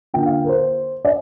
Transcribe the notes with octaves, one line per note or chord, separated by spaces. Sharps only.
D3 A#3 F4 G5
F5
A#4
C5
D5